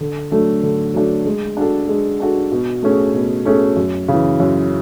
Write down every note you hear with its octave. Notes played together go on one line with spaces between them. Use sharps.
D3
F#3 A3 D4
D3
F#3 A3 D4
G#3
D4 F#4 A4
G#3
D4 F#4 A4
B2
A3 C#4 G#4
B2
A3 C#4 G#4
F#2
C#3 E3
F#2